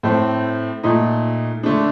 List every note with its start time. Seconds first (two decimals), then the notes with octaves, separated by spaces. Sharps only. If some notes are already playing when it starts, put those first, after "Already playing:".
0.03 A2 A3 C4
0.83 A#2 A3 D#4
1.63 D3 A3 D4